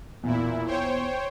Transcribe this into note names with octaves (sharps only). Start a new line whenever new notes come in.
B1 E2 A#2 E4
C5 C#5 G5